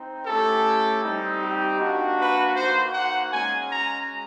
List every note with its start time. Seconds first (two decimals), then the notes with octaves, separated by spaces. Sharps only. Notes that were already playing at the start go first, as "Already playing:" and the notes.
Already playing: C4 D#4
0.26 A3 C#4 E4 G4 A4
1.03 G3 C4 D#4
1.42 G4
1.80 A#3 D4 F#4
2.18 B4
2.55 A#3 D#4 F#4 C5
2.94 F#5
3.32 G#3 C#4 F#4 G#5
3.70 A#5